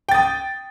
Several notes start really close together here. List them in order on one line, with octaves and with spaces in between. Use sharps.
G5 A6 D#6